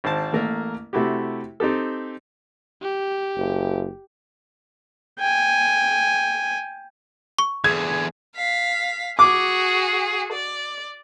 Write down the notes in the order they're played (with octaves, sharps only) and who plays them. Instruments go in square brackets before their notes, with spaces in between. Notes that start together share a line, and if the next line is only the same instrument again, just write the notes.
[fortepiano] G#1 C5 A5
A1 A3 A#3 A#4
C3 A3 E4 F#4 G4
C4 D#4 G4 A4
[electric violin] G4
[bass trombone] F#1
[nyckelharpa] G5 G#5
[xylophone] C#6
[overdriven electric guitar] E2 D3 [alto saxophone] G#4 [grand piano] G#6
[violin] F5 B6
[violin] F#4 G#4 [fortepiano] D6
[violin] D5